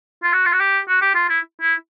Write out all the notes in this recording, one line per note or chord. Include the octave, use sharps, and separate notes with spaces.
F4
F#4
F4
F#4
G4
F#4
G4
F4
E4
E4